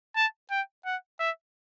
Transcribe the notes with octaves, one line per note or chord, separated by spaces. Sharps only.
A5
G5
F#5
E5